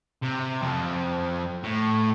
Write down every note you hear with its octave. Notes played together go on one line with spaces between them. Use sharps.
C3
F2
A2